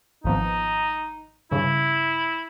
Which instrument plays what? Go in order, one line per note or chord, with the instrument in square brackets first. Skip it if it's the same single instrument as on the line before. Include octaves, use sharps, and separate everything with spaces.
[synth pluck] G#1 F3 B3 [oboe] D#4
[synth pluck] G2 C#3 [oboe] E4